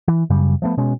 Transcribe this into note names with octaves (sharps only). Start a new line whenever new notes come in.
E3
F#2 C#3 G3
F3 A3 B3
B2 G#3 C#4